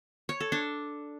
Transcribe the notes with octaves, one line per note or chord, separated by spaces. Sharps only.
C#5
A4
D4